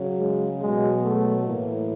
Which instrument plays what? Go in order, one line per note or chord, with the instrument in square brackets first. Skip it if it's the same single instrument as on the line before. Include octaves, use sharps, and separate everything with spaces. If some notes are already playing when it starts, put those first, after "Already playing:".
Already playing: [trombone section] C#3 F#3
G#3
B2 F#3 G#3
A3
A2 E3 A#3